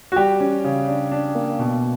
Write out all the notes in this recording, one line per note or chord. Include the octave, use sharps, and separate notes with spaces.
F#4
G3 G4
C#4
C#3
D4
D4
A#3
B2